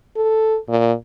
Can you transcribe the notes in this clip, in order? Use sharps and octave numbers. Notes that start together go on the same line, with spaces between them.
A4
A#2